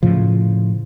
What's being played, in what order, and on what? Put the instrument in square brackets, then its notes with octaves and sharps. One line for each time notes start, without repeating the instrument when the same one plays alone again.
[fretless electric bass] A2 C#3 F3